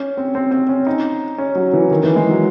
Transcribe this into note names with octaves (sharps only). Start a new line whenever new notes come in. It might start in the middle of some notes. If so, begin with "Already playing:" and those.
Already playing: C#4
C4
C4
C4
C#4
D#4
C#4
F#3
E3
D#3
E3
G#3
F#3